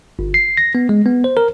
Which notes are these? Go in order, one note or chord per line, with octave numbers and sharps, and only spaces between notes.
G1
C7
A#6
B3
G#3
B3
C5
A#4